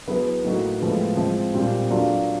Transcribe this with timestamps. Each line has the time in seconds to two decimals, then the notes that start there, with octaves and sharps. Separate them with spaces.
0.08 F#3 B3 E4 G#4 B4
0.44 A2 F#3 A#3 D#4 F#4
0.80 A2 F3 G#3 B3
1.16 F3 G#3 C4
1.54 A#2 G3 C4 F4
1.90 F#3 A#3 D4 F4 A4